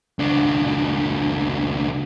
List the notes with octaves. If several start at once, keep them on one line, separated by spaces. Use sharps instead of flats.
C#2 D4